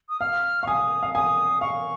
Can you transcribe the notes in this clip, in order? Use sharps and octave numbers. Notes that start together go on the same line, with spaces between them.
D#6
F5 F6
F5 C#6
G#5 D#6
F5
G#5 D#6
F5 C#6